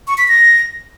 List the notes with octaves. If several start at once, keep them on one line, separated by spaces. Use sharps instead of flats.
C#6
B6
A#6